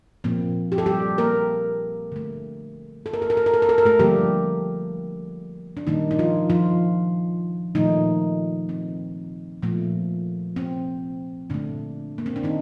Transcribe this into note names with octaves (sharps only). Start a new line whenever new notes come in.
A#2 F3 A#3 C4
G4
A4
G3 G4
A#3 A#4
D3 A3
A4
A#4
A4
A#4
A4
A#4
A4
A#4
A4
A#4
A3 A4
D3 F3 G3 A#3 G4
D4
A#2 D#3 G3 A#3 D#4
D#4
F3 F4
F3 F4
A#2 D#3 F3 A3 D#4
C4
A#2 F3 A3
C4
A#2 D3 A3 D4
A#3
C4
D4
D#3 D#4